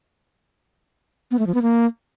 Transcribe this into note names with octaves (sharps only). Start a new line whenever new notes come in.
B3
A3
F3
B3
A#3